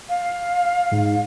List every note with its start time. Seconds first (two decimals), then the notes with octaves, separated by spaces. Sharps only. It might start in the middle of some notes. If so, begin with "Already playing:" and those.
0.09 F5
0.91 G#2